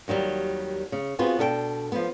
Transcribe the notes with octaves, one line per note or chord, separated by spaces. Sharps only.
D#2 D#3 F#3 G3
C#3
B3 C4 F4 F#4 G#4 B4
B2 D4 A4 D#5 G5
F3 B3